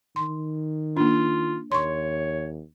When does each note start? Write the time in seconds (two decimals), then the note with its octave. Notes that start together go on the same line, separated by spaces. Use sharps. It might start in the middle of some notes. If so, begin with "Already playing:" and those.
0.16 D#3 C6
0.97 A#3 D4 F4
1.72 D#2 C#5 C6 C#6